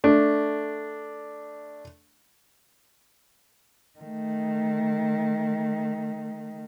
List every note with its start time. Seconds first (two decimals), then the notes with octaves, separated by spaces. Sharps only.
0.04 A3 D4
4.00 D#3 A3